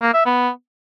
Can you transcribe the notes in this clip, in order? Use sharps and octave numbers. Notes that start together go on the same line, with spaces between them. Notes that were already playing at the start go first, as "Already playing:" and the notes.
A#3
E5
B3